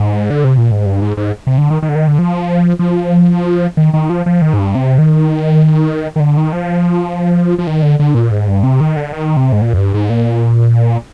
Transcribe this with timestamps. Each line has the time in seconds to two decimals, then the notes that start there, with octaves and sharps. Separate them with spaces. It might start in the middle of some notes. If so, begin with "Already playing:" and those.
Already playing: G#2
0.30 D3
0.44 C3
0.58 A#2
0.71 G#2
0.86 G2
1.02 G#2
1.17 G#2
1.47 C3
1.58 D3
1.70 D#3
1.82 D#3
1.89 D3
1.95 D#3
2.08 D3
2.19 F3
2.79 F3
3.77 D#3
3.94 D#3
4.10 F3
4.26 F3
4.42 D#3
4.54 G#2
4.59 G2
4.75 C3
4.98 D#3
6.16 D#3
6.20 D3
6.37 D#3
6.53 F3
7.58 F3
7.67 D#3
7.82 D3
7.99 D3
8.15 A#2
8.31 G#2
8.48 G2
8.63 C3
8.81 D#3
8.96 D3
9.12 D#3
9.37 C3
9.52 G#2
9.62 A#2
9.73 F2
9.78 G2
9.94 G#2
10.10 A#2